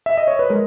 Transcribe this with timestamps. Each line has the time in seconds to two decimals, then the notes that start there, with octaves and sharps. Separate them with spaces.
0.06 E5
0.18 D#5
0.28 C#5
0.39 B4
0.50 G#3 A#4